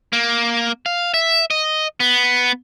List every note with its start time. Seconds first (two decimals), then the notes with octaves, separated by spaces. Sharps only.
0.13 A#3
0.86 F5
1.14 E5
1.50 D#5
2.00 B3